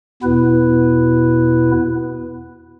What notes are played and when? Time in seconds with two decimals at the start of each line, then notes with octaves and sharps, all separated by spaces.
0.22 E2 B2 B3 E4 B4